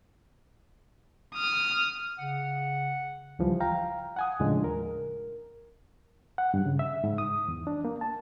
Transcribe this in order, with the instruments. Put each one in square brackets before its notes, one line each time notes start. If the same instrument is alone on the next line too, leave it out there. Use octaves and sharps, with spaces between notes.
[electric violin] D#6 F6
[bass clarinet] C#3 [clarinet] F#5
[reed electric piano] C#2 E3 F3 G3
F5 G5 A#5
F#5 G#5 D#6
D#2 A2 C#3 F3 G#3 D4
A#4
F#5
G2
C#3
E5
G#2
D#6
E2
D4
A#3
A5